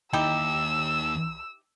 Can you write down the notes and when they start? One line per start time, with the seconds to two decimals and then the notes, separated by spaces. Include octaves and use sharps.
0.13 D#2 D#4 E4 G4 E6